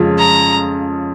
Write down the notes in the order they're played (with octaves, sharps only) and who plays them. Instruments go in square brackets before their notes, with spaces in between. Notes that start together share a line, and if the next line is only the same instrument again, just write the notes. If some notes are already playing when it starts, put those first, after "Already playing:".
Already playing: [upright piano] F2 C#3 G#3 C#4 F4
[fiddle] A#5